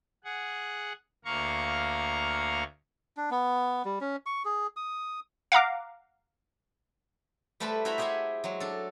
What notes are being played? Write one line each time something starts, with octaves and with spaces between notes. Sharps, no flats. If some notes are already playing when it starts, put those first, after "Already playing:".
G#4 F#5
D2 A#3 F5 A#5 C#6
D4
B3
G3
C#4
C#6
G#4
D#6
F5 F#5 A#5 D6
G3 A3 B4 C5 A5 B5
E4 F#4 C5 E5 A#5 B5
G4 G#4 C5 E5 F#5 G#5
F#3 G#3
D4 A4